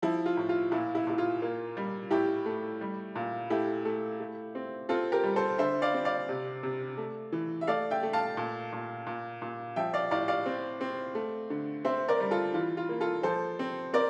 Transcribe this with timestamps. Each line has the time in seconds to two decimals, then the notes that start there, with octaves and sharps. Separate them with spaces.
0.02 F3 E4
0.26 F4
0.37 A2
0.49 F4
0.72 A#2 E4
0.95 E4
1.07 A#2 E4
1.18 F4
1.42 A#3
1.77 G3
2.11 A2 E4 G4
2.46 A3
2.81 G3
3.15 A#2
3.50 A3 E4 G4
3.85 A3
4.20 A3
4.55 C4
4.89 C4 F4 A4
5.12 G4 A#4
5.23 G3
5.36 A4 C5
5.58 D3 C5 E5
5.82 D5 F5
5.94 C4
6.05 D5 F5
6.29 C3
6.63 C3
6.97 A3
7.32 E3
7.61 E5
7.67 A3 D5 F5
7.90 E5 G5
8.03 A3
8.13 F5 A5
8.37 A#2
8.72 A#2
9.07 A#2
9.42 A#2
9.76 F3 E5 G5
9.94 D5 F5
10.11 A2 D5 F5
10.28 D5 F5
10.46 C4
10.81 C4
11.15 A3
11.50 D3
11.85 C4 C5 E5
12.08 A#4 D5
12.20 G3
12.31 F4 A4
12.54 E3 F4
12.77 F4
12.89 A#3
13.00 F4 A4
13.23 F3 A4 C5
13.59 C4
13.93 C4 A#4 D5